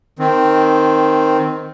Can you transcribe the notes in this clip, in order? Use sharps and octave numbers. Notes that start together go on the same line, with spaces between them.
D#3 C4